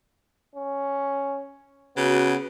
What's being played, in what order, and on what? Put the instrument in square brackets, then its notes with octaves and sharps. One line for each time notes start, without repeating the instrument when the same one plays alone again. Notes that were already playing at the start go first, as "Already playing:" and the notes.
[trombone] C#4
[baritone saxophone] C#3 [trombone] B3 [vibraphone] F#4